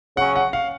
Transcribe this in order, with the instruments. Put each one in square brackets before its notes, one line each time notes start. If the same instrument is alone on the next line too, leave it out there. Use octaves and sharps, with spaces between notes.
[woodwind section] C#3 F#3 C#4 [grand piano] F#5
[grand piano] F#5
F5